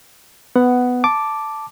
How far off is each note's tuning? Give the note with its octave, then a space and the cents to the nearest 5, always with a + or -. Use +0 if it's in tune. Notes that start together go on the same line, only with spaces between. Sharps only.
B3 +10 F#5 +5
A5 +0 D6 +0